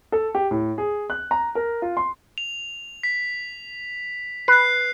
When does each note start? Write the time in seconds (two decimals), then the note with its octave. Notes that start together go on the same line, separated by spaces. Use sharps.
0.12 A4
0.35 G4
0.51 A2
0.78 G#4
1.10 F#6
1.31 A#5
1.55 A#4
1.82 F4
1.97 C6
2.38 F7
3.03 B6
4.48 B4 F#6 C7